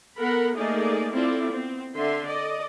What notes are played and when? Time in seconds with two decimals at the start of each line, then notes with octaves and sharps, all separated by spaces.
0.17 B3 A4 A#4 F#5 B5
0.54 A3 A#3 D#4 G#4 D5 D#5
1.13 C4 E4 F4 A4 D5
1.50 B3 C4
1.96 D3 E5 C6
2.27 A4 D5 D#5